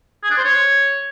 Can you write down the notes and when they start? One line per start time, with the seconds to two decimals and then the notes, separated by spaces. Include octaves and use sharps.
0.23 G#4
0.30 D4
0.37 C5
0.44 C#5